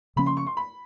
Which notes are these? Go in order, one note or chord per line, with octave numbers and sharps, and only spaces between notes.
C#3 F3 A#3 C#4 B5
C6
C#6
C6
B5